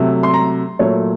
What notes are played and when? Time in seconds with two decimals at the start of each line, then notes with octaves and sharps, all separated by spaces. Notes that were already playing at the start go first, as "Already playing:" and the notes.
Already playing: C3 F#3 A3
0.23 C6
0.34 A#5
0.79 A#2 F#3 A3 C#5